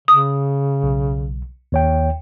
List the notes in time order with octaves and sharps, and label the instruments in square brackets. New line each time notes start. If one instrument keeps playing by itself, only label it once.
[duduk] C#3 [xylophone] D#6
[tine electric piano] B1
D#2 C#5 G5